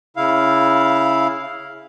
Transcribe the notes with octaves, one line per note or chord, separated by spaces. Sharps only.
C#3 E4 F5